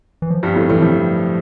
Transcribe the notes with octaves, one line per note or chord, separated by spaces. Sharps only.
E3
F3
G2 G3
A2 A3
A2 E3 A3
G2 F3 G3